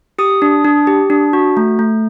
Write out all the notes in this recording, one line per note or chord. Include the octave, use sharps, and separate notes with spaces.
G4 D#6
D4
D4
G4
D4
F#4
A3
A3